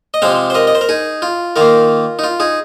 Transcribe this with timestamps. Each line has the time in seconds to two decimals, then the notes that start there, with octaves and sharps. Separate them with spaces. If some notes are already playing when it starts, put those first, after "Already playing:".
0.14 D#5
0.22 C3 F3 G#3 C4 C5 F5
0.50 C5
0.55 A#4 D#5
0.67 D#5
0.75 C5
0.81 A#4
0.89 D#4 G#4
1.22 F4
1.56 D#3 A#3 F4 A#4
2.19 D#4
2.24 F4
2.40 D#4 G#4